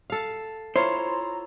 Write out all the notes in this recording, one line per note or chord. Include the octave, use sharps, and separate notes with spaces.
A4 F5
E4 F4 C5 C#5 A#5